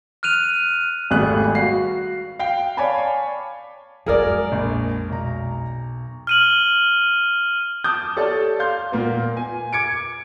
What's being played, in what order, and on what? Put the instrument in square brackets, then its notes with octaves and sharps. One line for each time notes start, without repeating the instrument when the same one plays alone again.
[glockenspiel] F6 F#6 D#7 F7
[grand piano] G#1 G3 A3 B3 G#4 F#6
F#4 F5 C7
F5 G5 C7
C#5 D5 F5 G#5 A5 B5
[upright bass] F2 G#3 [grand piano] F#3 [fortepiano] G#4 A#4 D5
[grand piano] A#1
B1 A#5
[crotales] F6 D#7 F#7
[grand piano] A5 D6 D#6 G6
G4 A4 C#5 D5 A5
F5 C6 G6
A#2 A#3 B3
G#5
D6 G#6 C#7 D7